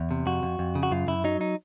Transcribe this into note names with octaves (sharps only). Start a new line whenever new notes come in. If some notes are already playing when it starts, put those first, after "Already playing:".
Already playing: E2
C3
F2 F#4
F2
F2
C#3
F#4
F#2 F4
F#2 E4
F#3 D#4
D#4